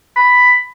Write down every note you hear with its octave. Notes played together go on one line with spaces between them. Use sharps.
B5